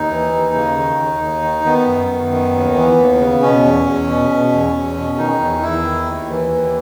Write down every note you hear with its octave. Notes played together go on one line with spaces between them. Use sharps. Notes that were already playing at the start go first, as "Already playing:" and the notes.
Already playing: D#2 D#4
E3
D#2
C#3
D#3
D#2
D#2
D#3
D#3 B3
F#2
F#2
D#3
D#2
E3
D#2
C#3
B2 C#4
E2
E2
B2
B2
E2
E2
B2
D#3 D#4
E2
E2 E4
D#3
D#2
E3
D#2